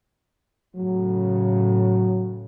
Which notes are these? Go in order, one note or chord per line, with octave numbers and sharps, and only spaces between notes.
A2 C#3 F#3